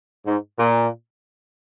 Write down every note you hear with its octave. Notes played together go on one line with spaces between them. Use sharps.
G#2
A#2